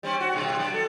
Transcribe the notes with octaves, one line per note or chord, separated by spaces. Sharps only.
G3 C4 C#4
F#4
G2 B2
F#3 G3
A4